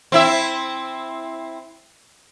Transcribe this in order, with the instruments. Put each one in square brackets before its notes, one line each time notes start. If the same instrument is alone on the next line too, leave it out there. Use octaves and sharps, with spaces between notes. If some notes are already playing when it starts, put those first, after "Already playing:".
[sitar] C4 E4 E5